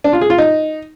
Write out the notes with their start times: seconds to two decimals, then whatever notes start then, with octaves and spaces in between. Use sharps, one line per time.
0.04 D4
0.13 F4
0.21 G#4
0.30 F4
0.38 D#4